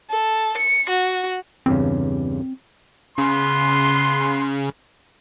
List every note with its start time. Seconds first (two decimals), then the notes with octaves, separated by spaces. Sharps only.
0.10 A4
0.57 C#7
0.89 F#4
1.66 E2 G2 C#3 C4
3.18 C#3 B3 C6